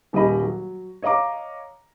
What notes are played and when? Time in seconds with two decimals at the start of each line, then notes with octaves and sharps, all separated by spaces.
0.13 D#1 G3 G#4 A#4 D#5 B5
0.43 F#3
1.02 C#5 D#5 F5 A#5 D6